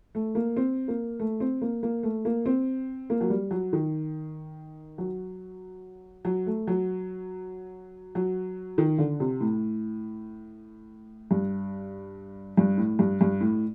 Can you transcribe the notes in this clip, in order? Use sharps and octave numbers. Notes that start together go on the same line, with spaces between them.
A3
A#3
C4
A#3
A3
C4
A#3
A#3
A3
A#3
C4
A#3
F#3
G3
F#3
D#3
F#3
F#3
A3
F#3
F#3
D#3
D3
C3
A2
G2
G2
A2
G2
G2
A2